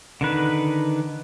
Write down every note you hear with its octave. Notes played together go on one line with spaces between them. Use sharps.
D3 D#3 B4